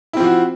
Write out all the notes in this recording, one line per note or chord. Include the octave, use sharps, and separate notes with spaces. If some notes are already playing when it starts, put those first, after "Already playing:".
F3 C4 E4 F#4